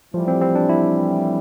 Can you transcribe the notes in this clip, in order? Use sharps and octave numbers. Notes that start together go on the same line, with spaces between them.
A2 E3 F3 G3
C4
C4
D4
E4